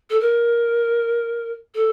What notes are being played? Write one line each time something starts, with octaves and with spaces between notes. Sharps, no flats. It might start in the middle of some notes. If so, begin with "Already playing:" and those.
A4
A#4
A4